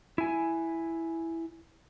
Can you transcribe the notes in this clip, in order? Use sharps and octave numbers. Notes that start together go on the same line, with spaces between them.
E4 G#5